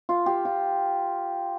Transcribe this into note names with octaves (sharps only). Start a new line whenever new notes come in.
F4
G4
F4